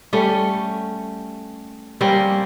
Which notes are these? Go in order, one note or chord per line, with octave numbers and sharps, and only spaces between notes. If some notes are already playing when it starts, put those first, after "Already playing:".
G3 A3 C#4
G3 A#3 C4 C#4